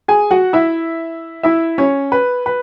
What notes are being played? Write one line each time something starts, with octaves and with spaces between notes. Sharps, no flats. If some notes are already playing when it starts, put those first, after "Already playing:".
G#4 G#5
F#4 F#5
E4 E5
E4 E5
C#4 C#5
B4
B4